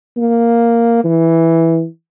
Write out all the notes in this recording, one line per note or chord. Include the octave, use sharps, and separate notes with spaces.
A#3
E3